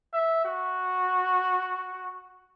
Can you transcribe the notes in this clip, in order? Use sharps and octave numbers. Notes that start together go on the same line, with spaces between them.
E5
F#4